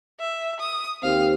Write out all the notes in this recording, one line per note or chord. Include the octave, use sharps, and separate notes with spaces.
E5
D#6
D#2 C4 F5